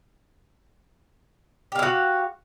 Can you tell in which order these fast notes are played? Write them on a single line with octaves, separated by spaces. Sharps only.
G4 F5 E4 F#4